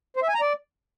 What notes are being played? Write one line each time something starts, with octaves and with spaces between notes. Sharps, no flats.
C5
E5
G#5
A#5
D5